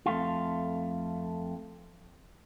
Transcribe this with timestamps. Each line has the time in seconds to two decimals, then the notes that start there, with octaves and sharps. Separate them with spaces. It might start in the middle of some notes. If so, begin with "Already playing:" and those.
0.06 F2 A3 F4